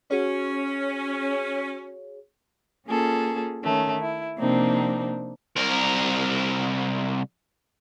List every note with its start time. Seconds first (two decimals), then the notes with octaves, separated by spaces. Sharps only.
0.11 C#4 F#4 G#4 C#5
2.86 A#3 C#4 F4 G#4 A4
3.64 D#3 A3 C#4
4.01 E4
4.39 C3 F3 A#3 C4 D4 D#4
5.56 C2 A#4